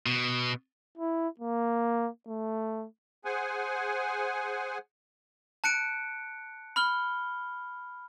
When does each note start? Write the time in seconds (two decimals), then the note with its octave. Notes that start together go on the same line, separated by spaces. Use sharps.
0.06 B2
0.98 E4
1.40 A#3
2.27 A3
3.25 G#4 C5 F#5 G#5
5.64 A5 F#6 C#7 D7
6.76 B5 F6 G7